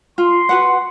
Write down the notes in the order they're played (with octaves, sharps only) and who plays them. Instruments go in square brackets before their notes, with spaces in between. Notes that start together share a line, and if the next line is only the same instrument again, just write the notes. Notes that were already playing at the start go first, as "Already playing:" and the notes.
[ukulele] F4 [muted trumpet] C6
[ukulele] F#4 B4 F#5